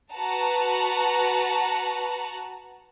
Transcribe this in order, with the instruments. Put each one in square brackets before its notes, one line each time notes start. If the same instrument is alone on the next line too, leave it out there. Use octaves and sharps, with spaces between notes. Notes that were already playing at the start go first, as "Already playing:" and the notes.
[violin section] F#4 B4 F#5 A5 A#5